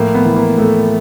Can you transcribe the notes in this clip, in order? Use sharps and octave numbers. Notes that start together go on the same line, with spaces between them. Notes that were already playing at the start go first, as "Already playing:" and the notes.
Already playing: A2 F3 A#3
B3
E3
A#3
A2 A3